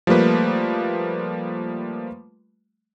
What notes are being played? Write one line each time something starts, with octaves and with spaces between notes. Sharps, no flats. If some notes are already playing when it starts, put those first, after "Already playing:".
F3 G3 A3 A#3 B4